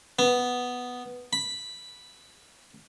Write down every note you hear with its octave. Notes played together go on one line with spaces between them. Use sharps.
B3
B5